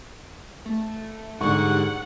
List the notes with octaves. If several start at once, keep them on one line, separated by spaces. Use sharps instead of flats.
A3
G#2 D3 G3 F#5 C#6